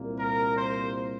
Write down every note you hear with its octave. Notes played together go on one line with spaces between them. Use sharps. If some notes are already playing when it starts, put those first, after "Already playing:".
Already playing: C2 A#2 A#3
A#4
C5